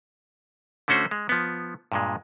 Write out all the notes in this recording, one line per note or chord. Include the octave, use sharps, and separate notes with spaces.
D3 A3 C#4 F#4 C5
G#3
F3 B3
G2 A#2 G#3